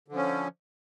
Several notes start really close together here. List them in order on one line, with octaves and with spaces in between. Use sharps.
D3 F3 C#4